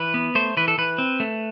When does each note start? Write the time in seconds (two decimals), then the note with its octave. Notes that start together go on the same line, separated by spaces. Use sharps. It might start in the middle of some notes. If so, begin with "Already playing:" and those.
Already playing: E3 B4
0.14 B3
0.35 A3 C5
0.57 E3 B4
0.68 A4
0.78 E3 B4
0.98 C4
1.20 A3